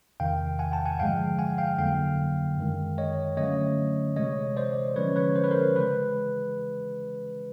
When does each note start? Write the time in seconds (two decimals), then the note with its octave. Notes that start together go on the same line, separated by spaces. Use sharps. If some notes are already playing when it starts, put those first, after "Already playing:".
0.20 E2 C3 D#3 F5 G5
0.59 F#5 G#5
0.72 G5 A5
0.85 F#5 G#5
0.99 G2 D3 F3 G#3 F5 G5
1.39 F#5 G#5
1.58 F5 G5
1.78 F2 D3 F#3 A#3 F5 G5
2.58 F#2 D#3 G#3
2.98 C#5 D#5
3.37 D3 F#3 A3 C#4 C#5 D#5
4.16 C3 E3 G#3 C#5 D#5
4.57 C5 D5
4.96 D3 F3 G#3 C#4 B4 C#5
5.16 B4 C#5
5.36 C5
5.44 B4
5.51 A#4 C5
5.76 C#3 E3 G#3 B4